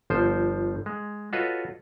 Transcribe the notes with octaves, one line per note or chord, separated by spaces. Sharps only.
G1 F3 C5
G#3
F4 F#4 A4 B4 C#5 D#5